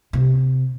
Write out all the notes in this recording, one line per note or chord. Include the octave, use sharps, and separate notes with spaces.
C3